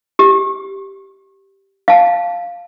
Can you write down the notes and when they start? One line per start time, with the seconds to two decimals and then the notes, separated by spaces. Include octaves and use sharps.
0.19 G4
1.88 F5 A5